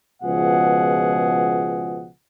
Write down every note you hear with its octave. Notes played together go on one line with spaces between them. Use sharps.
C#2 B2 F3 G#4 F#5